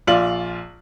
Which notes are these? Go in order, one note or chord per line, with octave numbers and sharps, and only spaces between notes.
A#1 F4 D5 F#7